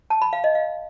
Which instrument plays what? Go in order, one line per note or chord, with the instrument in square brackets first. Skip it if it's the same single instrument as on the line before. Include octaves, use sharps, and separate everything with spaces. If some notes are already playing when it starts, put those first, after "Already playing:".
[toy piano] A5
B5
F5
D#5
F5